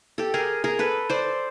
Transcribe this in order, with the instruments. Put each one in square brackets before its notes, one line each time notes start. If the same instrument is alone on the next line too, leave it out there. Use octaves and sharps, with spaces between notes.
[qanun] G4 A4
G#4 A#4
G#4 A#4
A4 B4
C5 D5